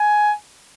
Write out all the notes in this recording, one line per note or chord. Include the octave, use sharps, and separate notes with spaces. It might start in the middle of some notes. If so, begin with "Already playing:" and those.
Already playing: G#5